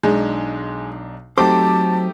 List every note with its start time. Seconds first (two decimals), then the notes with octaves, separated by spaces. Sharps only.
0.03 B1 G#3 D4 D#4
1.38 F#3 A3 C4 D#4 G4 C5 A5 D6